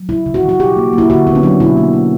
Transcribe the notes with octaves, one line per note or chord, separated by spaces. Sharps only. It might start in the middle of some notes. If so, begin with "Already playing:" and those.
Already playing: F#3
C#3 E4
C#3
F#4
E3
F#4
B2 G4
A#3
A#3 E4
D3 F#4
D3 B3
C#4
F#3 D4
B2 E4
A#3
A#3